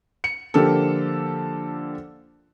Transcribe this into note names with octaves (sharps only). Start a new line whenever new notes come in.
C#7
D3 F3 A#3 G4 A4